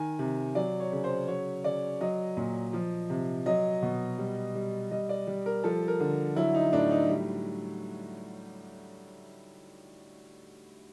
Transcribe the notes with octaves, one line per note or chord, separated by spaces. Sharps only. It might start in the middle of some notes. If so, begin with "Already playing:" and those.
Already playing: D#3 G#5
C3
F#3 D5
C#5
C#3
C5
F#3 C#5
C#3 D5
F#3 D#5
A#2
F3
C3
F#3 D#5
B2
G3
G3
G3 D#5
D5
G3
A#4
F3 A4
A#4
D3
F#3 E4
D#4
A2 D4
D#4
G3